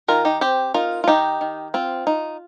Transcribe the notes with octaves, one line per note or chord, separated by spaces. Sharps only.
D#3 F4 A#4
D#4 G4
C4 G4 C5
D#4 F4 A#4
F4
D#3 D#4 G4
D#3
C4 F4
D#4